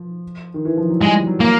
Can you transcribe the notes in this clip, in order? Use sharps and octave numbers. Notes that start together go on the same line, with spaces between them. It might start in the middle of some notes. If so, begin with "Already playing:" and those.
Already playing: F3
D#3
E3
F3
F#3
G3 G#3
F#3
A#3